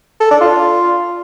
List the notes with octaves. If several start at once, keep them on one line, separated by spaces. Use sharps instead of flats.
A4
D4
F4